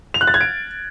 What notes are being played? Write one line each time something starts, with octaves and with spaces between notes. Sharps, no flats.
F7
F#6
A6
G#6
D7